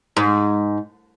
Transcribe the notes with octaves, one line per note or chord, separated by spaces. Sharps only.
G#2